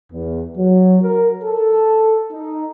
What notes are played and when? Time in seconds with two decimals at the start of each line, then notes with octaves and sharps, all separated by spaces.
0.12 E2
0.57 F#3
1.02 A#4
1.43 A4
2.32 D#4